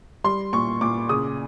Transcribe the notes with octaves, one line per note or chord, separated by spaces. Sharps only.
G3 C6
A#2 C#6
A#2 D6
C#3 D#6